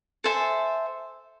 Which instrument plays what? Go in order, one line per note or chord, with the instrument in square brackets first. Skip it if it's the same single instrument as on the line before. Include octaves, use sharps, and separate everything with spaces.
[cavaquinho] A4 C5 E5 G#5